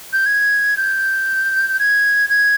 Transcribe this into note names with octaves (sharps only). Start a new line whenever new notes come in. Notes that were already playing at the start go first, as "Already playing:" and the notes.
G6
G#6
G6
G#6
G#6